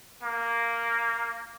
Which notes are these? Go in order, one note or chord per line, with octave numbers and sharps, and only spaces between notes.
A#3